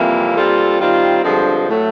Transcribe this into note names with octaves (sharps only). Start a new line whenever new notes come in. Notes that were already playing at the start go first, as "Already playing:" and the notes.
Already playing: F2 C3 E3 G3 A#3
A#2 G3 C4 F4 A4
D#3 G3 C4 F4
G2 D3 F3 G#3 C4
A2 F#3 A3